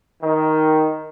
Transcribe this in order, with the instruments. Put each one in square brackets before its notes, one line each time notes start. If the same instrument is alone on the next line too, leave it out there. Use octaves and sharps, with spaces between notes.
[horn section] D#3